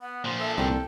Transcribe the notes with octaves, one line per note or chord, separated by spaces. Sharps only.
B3 F#5
A#2 F3 C5
A4 E5
C2 G5